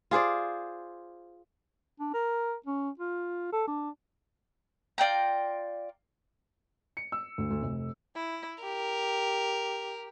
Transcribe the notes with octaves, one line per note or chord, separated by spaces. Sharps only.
F4 G#4 C5 D5
D4
A#4
C#4
F4
A4
D4
F4 D5 G5 A#5
C#7
E6
D2
D2
F1
E4
G4 A#4